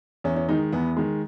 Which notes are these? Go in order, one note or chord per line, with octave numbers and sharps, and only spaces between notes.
E2 C#4
C#4
D#3 G#3 D#4
E2 B3
D#3 G#3